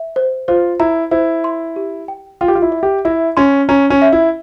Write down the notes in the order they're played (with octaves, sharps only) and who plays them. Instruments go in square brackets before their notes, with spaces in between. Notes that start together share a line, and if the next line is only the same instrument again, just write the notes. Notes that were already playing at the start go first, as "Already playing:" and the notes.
Already playing: [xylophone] E5
C5
[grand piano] F4 [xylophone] C5
[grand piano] E4 [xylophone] A#5
[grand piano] E4 [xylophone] C5
[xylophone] C6
G4
G5
[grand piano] F4 [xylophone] G5
[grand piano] G4
F4
E4
[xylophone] E5
[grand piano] G4
[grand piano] E4 [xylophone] E5
[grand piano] C#4 [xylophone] C6
[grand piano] C#4 [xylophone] A#5
[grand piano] C#4
[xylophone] E5
[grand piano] E4